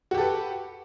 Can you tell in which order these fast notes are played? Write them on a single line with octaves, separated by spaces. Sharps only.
F#4 G4 A4 B4